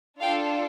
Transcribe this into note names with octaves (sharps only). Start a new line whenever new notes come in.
D4 F4 A4 F5 G5